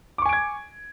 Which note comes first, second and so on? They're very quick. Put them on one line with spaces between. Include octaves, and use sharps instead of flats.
D6 C#6 G#5 D7 G#6